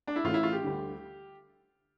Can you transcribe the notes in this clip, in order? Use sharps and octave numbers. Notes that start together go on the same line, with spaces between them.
D4
E4
A1 A2 E3 F4
E4
F4
G4
D2 D3 G3